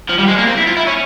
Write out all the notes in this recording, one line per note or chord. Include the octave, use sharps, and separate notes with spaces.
F3
G3
G#3
A#3
C4
E4
F4
E4
C#4